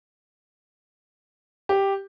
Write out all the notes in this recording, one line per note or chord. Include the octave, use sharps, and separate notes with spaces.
G4